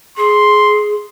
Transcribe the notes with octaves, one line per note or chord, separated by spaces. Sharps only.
G#4 C6